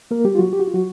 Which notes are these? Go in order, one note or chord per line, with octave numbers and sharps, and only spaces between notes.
A#3 A#4
G3 G4
F4
F#3 F#4
G4
F#4
F4
F#3 F#4